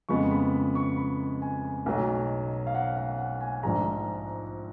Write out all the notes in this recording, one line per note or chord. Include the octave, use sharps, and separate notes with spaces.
F2 C#3 G#3 B3 C#6
B5
C#6
B5
G#5
B1 B2 F#3
F5
F#5
F5
F#5
G#5
A#1 G#2 F3 G#3 A#5